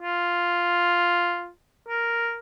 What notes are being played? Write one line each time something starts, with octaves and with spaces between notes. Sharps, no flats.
F4
A#4